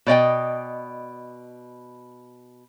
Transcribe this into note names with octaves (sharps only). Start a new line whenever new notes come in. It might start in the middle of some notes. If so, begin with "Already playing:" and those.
B2 D5 D#5 G5